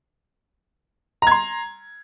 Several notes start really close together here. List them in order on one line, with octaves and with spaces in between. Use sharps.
A#5 G#6 C6